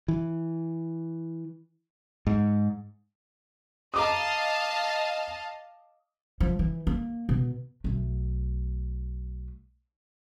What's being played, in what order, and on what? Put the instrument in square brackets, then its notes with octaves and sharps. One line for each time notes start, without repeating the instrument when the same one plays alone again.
[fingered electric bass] E3
G#2
[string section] D#5 F5 A5 [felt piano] A#5 D6 D#6
[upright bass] F3
E3
A#3
B2
B1 A3